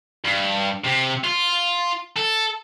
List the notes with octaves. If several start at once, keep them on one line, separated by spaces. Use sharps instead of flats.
G2
C3
F4
A4